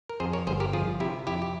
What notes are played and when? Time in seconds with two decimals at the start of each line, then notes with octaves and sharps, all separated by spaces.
0.09 A#4
0.20 F2 G#4 C5
0.33 A#4 C#5
0.47 G1 G#4 C5
0.60 G4 A#4
0.73 F3 F4 G#4
1.00 C3 E4 G4
1.27 F2 E4 G4
1.42 G4